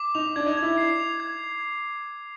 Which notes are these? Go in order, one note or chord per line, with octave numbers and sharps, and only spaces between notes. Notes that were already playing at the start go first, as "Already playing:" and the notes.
Already playing: D6
D#4 F7
D4 G#6
D#4
G#6
E4
C7
F7
G#6